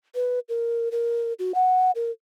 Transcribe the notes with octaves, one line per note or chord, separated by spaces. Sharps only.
B4
A#4
A#4
F#4
F#5
A#4